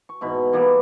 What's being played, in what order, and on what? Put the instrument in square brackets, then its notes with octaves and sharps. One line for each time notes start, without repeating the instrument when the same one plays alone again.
[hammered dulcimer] C#6
G#2 B2 E3 B5
E3 G3 A#3 B3